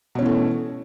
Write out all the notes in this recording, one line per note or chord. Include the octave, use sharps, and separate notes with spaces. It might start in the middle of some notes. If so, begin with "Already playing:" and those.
B2 E3 A3 C#4